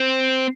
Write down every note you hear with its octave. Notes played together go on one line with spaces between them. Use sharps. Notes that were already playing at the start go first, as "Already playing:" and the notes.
Already playing: C4